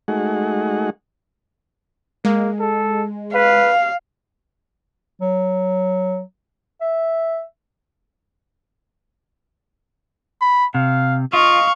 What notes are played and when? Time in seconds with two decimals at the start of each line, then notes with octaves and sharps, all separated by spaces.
0.08 G#3 A3 D#4 F#4 G#4 F#5
2.25 G#3 A#3
2.59 A4
3.34 B4 F5
5.22 F#3
6.81 E5
10.41 B5
10.75 C3 F5
11.33 F4 D#5 F5 C#6